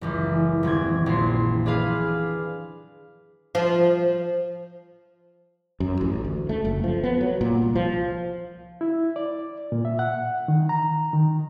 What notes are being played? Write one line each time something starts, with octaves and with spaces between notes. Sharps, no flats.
F#1 C#2 E3
D#1 E3 C4 G#6
A#1 C6
D4 G#4 B4 F5
F3
F#2
A1
D2
A3
F#1
F3
B3
F#3
A#2
C2
F3
E4
D5
A#2
E5
F#5
D#3
A#5
D#3